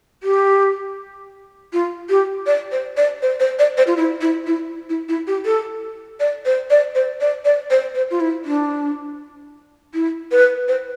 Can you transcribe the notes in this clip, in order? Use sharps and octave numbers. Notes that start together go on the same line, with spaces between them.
G4
F4
G4
D5
C5
D5
C5
C5
D5
C5
F4
E4
E4
E4
E4
E4
G4
A4
D5
C5
D5
C5
D5
D5
C5
C5
F4
E4
D4
E4
B4
C5